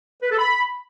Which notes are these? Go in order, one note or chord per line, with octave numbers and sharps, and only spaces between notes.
B4
A4
B5